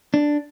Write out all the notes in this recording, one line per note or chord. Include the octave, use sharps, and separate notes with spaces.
D4